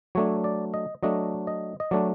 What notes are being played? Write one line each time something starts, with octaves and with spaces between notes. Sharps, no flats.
F#3 A3 D4 C#5
D5
D#5
F#3 A3 D4 D#5
D#5
D#5
F#3 A3 D4 D5